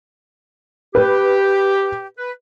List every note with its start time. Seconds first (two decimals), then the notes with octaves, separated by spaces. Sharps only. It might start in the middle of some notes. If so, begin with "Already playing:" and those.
0.95 G4 B4
2.18 B4